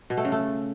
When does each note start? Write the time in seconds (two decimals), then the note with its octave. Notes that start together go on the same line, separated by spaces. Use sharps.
0.10 B2
0.17 A3
0.25 C#3
0.32 A3